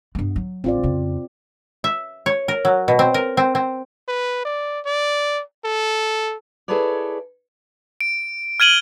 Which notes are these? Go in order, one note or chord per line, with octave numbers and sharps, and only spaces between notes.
G2 B3
F#3
A1 C4 F4 D5
F2 C#3
E5
C#5
A#4
F#3
B2
C4
A#4
C4
C4
B4
D5
D5
A4
E4 G#4 A4 B4 C#5 D5
D7
F6 G#6 D#7 F#7 G7